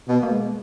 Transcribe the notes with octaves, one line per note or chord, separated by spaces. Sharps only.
B2
A#3
G#3